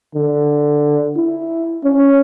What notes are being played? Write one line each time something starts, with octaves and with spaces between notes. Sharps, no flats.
D3
E4
C#4